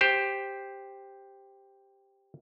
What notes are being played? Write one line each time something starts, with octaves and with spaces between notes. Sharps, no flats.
G4 C5